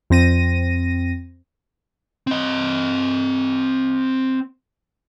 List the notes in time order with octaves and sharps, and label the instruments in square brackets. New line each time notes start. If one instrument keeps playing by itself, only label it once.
[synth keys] F2 C4 A#6 D#7
[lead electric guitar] C4 D#5